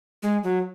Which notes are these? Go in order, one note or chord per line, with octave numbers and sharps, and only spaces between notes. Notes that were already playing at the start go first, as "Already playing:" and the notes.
G#3
F#3